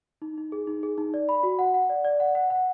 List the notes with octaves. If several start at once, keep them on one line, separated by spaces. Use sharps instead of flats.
D#4
D#4
G#4
D#4
G#4
D#4
D5
B5
F#4
F#5
F#5
D5
D5
F#5
F#5
F#5